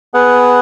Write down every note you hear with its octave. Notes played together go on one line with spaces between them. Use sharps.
B3 G#4 B4 F#5